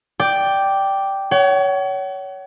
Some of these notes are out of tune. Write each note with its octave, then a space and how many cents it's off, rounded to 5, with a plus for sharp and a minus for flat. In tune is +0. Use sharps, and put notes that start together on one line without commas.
D5 +0 G5 +0 D6 +0
C#5 +25 F#5 +45